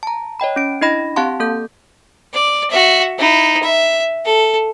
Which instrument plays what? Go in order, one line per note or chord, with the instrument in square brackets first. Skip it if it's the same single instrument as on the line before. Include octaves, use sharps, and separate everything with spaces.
[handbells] A5 A#5
C#5 D#5 G5 B5
C#4 D7
D4 E4 D#5 B5 A#6
C4 G4 F5 F#5 A5 C6
A#3 A4 G6
[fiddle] D5
F#4 E5
D#4 E4
E5
A4